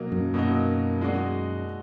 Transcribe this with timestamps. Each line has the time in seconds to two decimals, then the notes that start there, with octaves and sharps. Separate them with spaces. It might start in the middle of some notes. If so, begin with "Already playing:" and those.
Already playing: B2 F#3 A#3 D#4
0.12 F#2
0.34 B2 F#3 A#3 D#4
1.01 G#3 D#4 F#4 D5